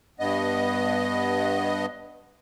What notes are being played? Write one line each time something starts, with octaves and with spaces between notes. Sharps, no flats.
G2 B3 D#5